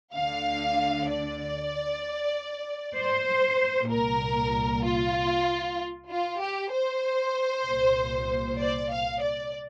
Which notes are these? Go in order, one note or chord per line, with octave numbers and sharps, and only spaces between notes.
D2 D3 F5
D5
C5
C2 A#2 A#4
F4
F4
G4
C5
C2 A#2
D5
F5
D5